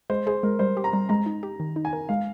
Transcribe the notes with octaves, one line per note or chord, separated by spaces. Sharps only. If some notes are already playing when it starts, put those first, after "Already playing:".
G#3 C5
G#4 C5
G#3 A#4
G3 C5
G4
A#5
G3
G#3 A#5
D#4
G4
D#3
D#4
G#5
A#4
G#3 F5